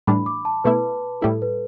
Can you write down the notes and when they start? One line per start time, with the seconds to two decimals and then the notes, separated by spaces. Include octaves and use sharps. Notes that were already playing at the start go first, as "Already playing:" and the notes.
0.07 A2 E3 G3 D4 B5
0.26 D6
0.45 A5
0.64 B2 A3 E4 B4
1.21 A2 G3 E4 A4
1.42 B4